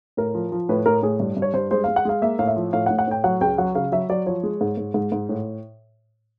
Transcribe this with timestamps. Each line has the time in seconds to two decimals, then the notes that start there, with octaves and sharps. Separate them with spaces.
0.17 A2 A#4
0.34 F3
0.52 F3
0.69 A2 B4
0.86 A2 A#4
1.03 A2 G#4
1.20 G2
1.37 G2
1.42 C#5
1.54 G2 C5
1.71 G#3 C5
1.84 F5
1.88 G#3
1.96 F#5
2.05 G#3 F5
2.22 A#3 E5
2.39 A2 F5
2.48 E5
2.56 F3
2.73 A2 F5
2.86 F#5
2.90 A2
2.99 F#5
3.07 A2 G5
3.24 F#3 F#5
3.41 C#2 G5
3.58 F#3 F#5
3.75 C#3 F5
3.92 F#3 E5
4.09 F#3 D5
4.26 F3 C#5
4.43 G#3
4.61 G#2
4.78 G#2
4.94 G#2
5.12 G#2
5.29 A2